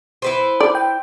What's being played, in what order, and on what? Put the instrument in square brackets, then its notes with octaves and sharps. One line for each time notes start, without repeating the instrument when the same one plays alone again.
[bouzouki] E4 B4 C5
[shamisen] D5
[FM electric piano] G5